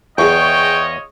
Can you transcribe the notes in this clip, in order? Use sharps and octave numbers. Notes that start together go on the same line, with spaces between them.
E2 F4 G#4 C#5 D#5 G5 C#6